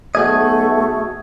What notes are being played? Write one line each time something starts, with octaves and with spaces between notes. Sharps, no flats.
B1 A3 F#4 G#4 D#5 G#6